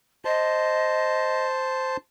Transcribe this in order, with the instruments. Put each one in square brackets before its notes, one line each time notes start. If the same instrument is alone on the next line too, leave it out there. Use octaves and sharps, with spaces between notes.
[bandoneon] C5 A5 [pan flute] D#5